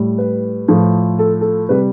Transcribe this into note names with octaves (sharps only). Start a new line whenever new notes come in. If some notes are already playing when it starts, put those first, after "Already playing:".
Already playing: A2 G3
B4
A2 F3 A3
A4
A4
C3 G3 B4